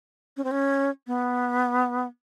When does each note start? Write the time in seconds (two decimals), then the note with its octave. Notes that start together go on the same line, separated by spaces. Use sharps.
0.37 C#4
0.44 C4
0.51 C#4
1.07 B3